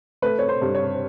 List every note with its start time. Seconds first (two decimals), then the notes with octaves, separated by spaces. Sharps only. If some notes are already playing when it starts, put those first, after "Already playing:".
0.22 A3 B4
0.39 C#5
0.49 C5
0.62 G2
0.75 C#5